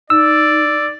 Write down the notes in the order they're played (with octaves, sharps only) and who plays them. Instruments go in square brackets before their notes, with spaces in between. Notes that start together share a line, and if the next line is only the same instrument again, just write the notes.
[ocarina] D#4 [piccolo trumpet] D5 [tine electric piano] E6